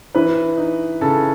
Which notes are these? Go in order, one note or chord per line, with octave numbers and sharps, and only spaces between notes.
E3 B4
D#4
C#3 A4